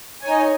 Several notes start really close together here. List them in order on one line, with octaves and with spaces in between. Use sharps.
G#5 C#5 D#4 D#5